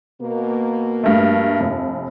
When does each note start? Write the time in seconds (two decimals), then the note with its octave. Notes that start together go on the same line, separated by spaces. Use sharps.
0.21 B2 A#3
1.04 G2 A3
1.60 F1